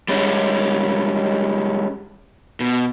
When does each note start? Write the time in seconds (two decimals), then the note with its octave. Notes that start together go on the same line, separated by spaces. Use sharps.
0.08 G3 G#3 C#4
2.60 B2